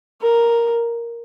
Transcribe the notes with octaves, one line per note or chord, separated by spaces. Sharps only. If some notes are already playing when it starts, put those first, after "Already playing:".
A#4